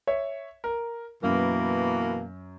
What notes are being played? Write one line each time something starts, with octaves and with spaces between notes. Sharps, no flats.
C#5 E5
A#4
F#2 B2 E3 A#3